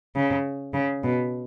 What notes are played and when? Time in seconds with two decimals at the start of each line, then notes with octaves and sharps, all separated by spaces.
0.16 C#3
0.74 C#3
1.03 B2